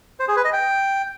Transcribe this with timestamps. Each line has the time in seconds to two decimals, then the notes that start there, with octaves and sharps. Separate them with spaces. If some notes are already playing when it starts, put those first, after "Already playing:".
0.19 C5
0.28 G#4
0.36 B4
0.45 D#5
0.53 G5